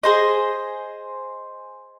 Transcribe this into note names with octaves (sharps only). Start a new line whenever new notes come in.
G#4 C5 D#5